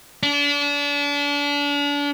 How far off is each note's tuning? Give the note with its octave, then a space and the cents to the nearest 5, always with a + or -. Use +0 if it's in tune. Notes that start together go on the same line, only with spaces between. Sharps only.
D4 -35